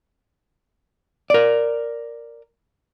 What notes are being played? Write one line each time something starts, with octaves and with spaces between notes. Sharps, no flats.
A#4 D5